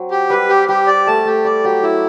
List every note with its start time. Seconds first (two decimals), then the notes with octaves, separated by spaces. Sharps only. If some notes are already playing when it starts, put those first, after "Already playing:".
Already playing: F#3 C4
0.11 G4
0.30 G3 B4
0.49 G4
0.68 G3 G4
0.87 D5
1.07 A3 A5
1.25 A3 G4
1.44 G3 D5
1.64 F#3 G4
1.83 F#3 E4